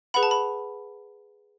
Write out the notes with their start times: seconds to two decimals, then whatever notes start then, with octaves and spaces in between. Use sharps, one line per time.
0.14 G#4 B4 F#5 B5
0.23 A5
0.31 B5